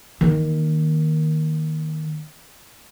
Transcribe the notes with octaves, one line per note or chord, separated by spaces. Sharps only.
D#3 A#3